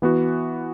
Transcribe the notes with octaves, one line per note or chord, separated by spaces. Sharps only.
E3 B3 F#4